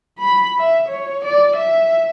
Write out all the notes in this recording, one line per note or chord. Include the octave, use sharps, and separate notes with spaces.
B5
E5
C#5
D5
E5